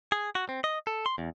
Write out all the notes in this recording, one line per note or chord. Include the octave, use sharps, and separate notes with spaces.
G#4
F#4
C4
D#5
A4
C6
E2